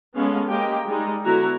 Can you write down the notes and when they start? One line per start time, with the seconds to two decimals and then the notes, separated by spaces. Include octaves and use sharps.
0.15 G#3 B3 C#4 A4 F5
0.50 G#3 A#3 G4 D#5 G5
0.86 G3 G#3 D#4
1.23 D3 B3 E4 F#4 A#5